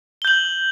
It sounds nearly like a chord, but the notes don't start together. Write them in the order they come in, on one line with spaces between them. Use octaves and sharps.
G7 G6 F#7